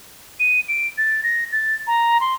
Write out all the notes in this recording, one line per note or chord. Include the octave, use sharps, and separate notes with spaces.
D#7
D7
A6
A#6
A6
A#5
C6